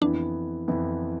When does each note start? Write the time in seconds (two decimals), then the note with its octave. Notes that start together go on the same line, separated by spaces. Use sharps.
0.01 F2 E3 B3 D4 E4
0.68 F2 E3 B3 E4